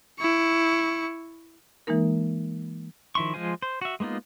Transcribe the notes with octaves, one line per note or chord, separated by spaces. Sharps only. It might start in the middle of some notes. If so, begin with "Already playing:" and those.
E4 C#6
E3 G#3 A#3 D#4 A#4
D#3 F3 E4 C6 C#6
F3 G#3 F4 C5 G#5
C5
F#4 E5
G#3 A#3 B3 D#4 F4